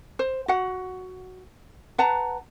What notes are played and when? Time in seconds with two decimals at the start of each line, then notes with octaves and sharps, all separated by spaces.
0.19 C5
0.48 F#4 F#5
1.98 B4 F#5 A5 A#5